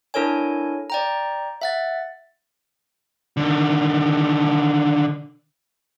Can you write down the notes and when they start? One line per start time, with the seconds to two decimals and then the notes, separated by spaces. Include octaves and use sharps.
0.14 D4 E4 A4 A#4 C#5 G#5
0.90 D5 G5 A#5
1.62 E5 F#5 A6
3.37 D3 D#3